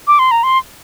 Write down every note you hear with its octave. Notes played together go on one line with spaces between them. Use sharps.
D6
C6
A#5
C6